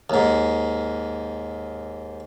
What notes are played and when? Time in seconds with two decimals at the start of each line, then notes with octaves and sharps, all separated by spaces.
0.10 D#2 G#2